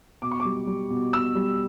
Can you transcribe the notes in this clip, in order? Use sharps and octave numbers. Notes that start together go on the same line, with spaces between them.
B2 D6
C#6
D6
G3
G3
B2
B2 E6
G3